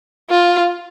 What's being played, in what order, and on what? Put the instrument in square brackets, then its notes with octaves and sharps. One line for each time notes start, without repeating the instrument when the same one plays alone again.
[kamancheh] F4